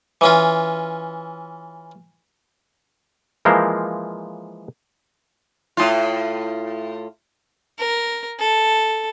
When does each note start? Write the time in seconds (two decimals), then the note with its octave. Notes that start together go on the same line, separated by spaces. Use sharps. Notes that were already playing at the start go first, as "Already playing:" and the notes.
0.21 E3 C#4 F4
3.45 E3 F3 G#3 A#3 A#4 C5
5.77 A2 F4
7.79 A#4
8.40 A4